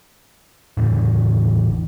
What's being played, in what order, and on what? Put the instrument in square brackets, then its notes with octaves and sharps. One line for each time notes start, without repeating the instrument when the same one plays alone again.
[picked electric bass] A1 E2 A2 D3